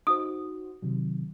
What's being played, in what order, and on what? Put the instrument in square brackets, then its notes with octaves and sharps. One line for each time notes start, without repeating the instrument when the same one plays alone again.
[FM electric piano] D#4 F#4 C5 [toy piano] D#6
[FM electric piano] C3 D#3 F#3